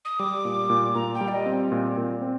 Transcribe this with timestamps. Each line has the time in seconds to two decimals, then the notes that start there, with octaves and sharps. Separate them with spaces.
0.05 D#6
0.19 G3 D6
0.45 A#2
0.70 A#2
0.95 A#2 A#5
1.14 G5
1.21 G3
1.28 D5
1.34 D#5
1.46 C4
1.72 A#2
1.98 A#2
2.22 C4